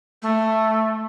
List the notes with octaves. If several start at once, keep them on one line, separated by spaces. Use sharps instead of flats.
A3